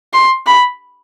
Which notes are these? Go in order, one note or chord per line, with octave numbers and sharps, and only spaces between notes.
C6
B5